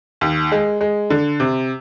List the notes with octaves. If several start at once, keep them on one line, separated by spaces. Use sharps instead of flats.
D#2
G#3
G#3
D3
C3